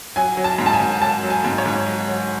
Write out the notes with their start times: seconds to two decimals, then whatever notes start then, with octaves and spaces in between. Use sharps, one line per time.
0.16 F#3 G#5
0.37 F#3
0.44 A5
0.58 G#2
0.66 A5
0.73 G#5
0.80 G#2
1.01 F#3 A5
1.23 F#3
1.30 G#5
1.44 G#2
1.58 C#5
1.66 G#2
1.87 F#3
2.08 F#3